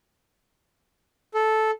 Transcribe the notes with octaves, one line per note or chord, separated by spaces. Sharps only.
A4